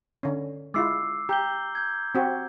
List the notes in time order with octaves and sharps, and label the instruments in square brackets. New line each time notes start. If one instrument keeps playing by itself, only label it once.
[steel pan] D3 C#4
[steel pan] G#3 E4 F4 [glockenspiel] D6 E6 C7
[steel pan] G4 [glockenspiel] A#5 G6 G7
[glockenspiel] G6 G#6
[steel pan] C4 F#4 G4